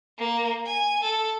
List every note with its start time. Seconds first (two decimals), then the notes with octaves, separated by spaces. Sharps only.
0.18 A#3
0.66 G#5
1.03 A4